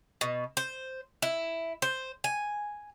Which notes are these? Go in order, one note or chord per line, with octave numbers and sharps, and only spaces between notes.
B2
C5
E4
C5
G#5